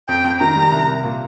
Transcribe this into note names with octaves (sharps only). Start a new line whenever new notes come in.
F2 G5
F2
D#3 A#5
G3
C2
C2
A#2